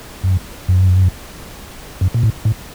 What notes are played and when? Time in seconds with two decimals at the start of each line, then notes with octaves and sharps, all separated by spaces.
0.24 F#2
0.68 F#2
2.01 F#2
2.14 A#2
2.23 A2
2.45 A2